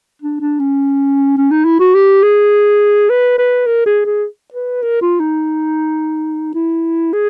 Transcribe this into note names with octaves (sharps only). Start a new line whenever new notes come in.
D4
D4
C#4
C#4
D#4
E4
F#4
G4
G#4
B4
B4
A#4
G#4
G#4
B4
A#4
F4
D#4
E4
G#4